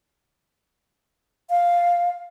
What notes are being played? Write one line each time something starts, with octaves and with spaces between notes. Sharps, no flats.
F5